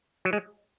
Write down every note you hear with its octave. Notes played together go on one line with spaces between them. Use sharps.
F#3
G#3